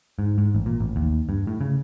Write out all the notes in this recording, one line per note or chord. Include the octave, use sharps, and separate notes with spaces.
G#2
G#2
A1
A#2
A1
D#2
G2
A2
C#3